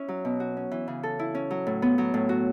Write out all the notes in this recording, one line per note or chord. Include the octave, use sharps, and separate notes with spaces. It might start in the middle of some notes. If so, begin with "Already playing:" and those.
Already playing: C#4 E4
F#3
B2
F#4
C#4
E3
C#3
A4
E4
C#4
F#3
A2
B3
F#3
A2
F#4